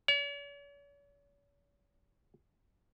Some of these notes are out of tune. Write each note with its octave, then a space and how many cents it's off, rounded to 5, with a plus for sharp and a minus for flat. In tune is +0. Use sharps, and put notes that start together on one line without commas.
C#5 +45